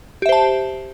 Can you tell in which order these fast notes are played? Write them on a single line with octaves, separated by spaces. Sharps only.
G4 E5 C5 A5